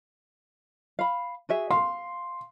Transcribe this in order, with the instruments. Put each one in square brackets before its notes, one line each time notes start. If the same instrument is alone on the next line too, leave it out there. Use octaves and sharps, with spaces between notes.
[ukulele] F5 B5
F#4 G#4 E5
[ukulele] F5 [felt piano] C6